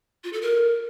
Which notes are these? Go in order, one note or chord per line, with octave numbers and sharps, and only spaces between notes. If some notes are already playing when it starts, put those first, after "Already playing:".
F4
A4
A#4